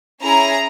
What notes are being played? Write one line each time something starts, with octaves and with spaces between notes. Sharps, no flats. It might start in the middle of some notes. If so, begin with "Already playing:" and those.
C#4 E4 G#4 A#5